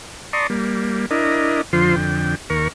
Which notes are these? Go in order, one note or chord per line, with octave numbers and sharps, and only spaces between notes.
D5 A5 A#5 C6 C#6 D#6
G3 A#3
D4 E4 A#4 D#5
F2 D3 F3 F4 C5 C6
F2 D3 G5
D#2 A#4 C#6